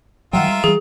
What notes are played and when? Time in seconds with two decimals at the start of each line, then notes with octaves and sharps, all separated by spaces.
0.33 D#3 F#3 G3 F4 A#4 E5 F#5 G5
0.48 G3 G#3
0.64 E3 G3 G#4